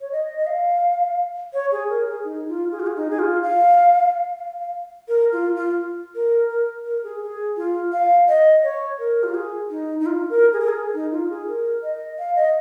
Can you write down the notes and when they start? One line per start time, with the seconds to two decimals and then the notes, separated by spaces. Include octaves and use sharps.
0.01 C#5
0.12 D#5
0.37 D#5
0.47 F5
1.53 C#5
1.72 G#4
1.90 A#4
2.07 G#4
2.25 D#4
2.49 F4
2.72 G#4
2.80 F4
2.87 G#4
2.96 D#4
3.10 G#4
3.19 F4
3.43 F5
4.37 F5
4.60 F5
5.08 A#4
5.33 F4
5.56 F4
6.15 A#4
6.50 A#4
6.86 A#4
7.04 G#4
7.22 G#4
7.57 F4
7.92 F5
8.28 D#5
8.63 C#5
8.99 A#4
9.23 F4
9.34 G#4
9.71 D#4
10.00 D#4
10.06 F4
10.29 A#4
10.53 G#4
10.60 A#4
10.68 G#4
10.94 D#4
11.12 F4
11.30 G#4
11.48 A#4
11.83 D#5
12.19 F5
12.36 D#5